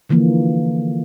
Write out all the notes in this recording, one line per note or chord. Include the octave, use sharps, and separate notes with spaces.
D3 E3 F3 A#3